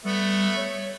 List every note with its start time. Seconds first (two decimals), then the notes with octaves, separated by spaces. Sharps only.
0.05 G3 A3 B3 E5
0.57 C#5